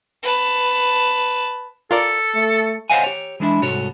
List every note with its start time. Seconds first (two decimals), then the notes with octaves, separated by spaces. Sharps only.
0.23 B4 A5
1.91 F4 A4 A#4 D5
2.35 A3
2.90 C5 C#5 D#5 F5 F#5 G#5
3.04 G4 C#5
3.40 E3 G#3 D4 E4
3.62 C2 G#2 F#4 A4 C#5